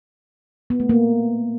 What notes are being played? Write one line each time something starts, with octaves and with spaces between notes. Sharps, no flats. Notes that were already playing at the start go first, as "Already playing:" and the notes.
B3
A3
A#3